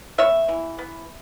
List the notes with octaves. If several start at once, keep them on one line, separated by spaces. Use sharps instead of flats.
B3 C#5 E5
E3
B3